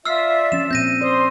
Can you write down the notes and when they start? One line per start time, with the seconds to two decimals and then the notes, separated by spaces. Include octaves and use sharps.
0.05 F4 D5 E5 E6 F6 C7
0.52 F3 C#4 E7
0.71 A#2 C4 G6 A#6 D#7
1.01 C5 D5 C6 D#6